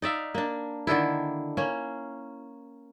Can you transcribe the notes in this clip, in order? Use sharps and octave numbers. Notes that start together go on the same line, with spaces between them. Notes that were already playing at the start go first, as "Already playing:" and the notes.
D#4 D5 E5 F5
A#3 D4
D3 D#3 D4 E4
A#3 C#4